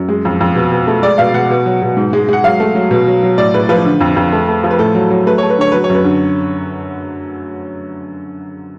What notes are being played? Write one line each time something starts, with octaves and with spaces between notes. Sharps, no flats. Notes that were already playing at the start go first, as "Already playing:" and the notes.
Already playing: F#2
G#3
F2
F2
B2
B2
A3
G#3 D5
B2 F5
B2 F#5
B2
F#3
B2
G#2
G#3
G#3 F#5
F#3 F5
A3
F#3
B2
F#3
F#3
A2 D5
A2 B4
F3 B4
D3
F2
F2
A3
A3
F3
B4
A2 A4
F#3
F#3
A3 B4
A3 C#5
B4
D3 C#5
F#3 B4
C#5
F#2
B4
D3